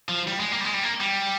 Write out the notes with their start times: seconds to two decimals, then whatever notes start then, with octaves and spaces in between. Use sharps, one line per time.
0.09 F3
0.27 G3
0.40 G#3
0.52 A#3
0.60 G3
0.65 G#3
0.74 G3
0.83 A#3
1.01 G3